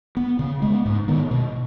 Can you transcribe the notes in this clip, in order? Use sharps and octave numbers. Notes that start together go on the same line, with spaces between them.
B3
C#3
G#3 B3
G#2
D#3 B3
B2